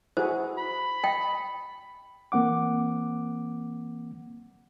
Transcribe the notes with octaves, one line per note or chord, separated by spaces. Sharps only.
E4 F#4 G#4 C5
B5
D#5 G5
E3 A#3 C4 F#5 D6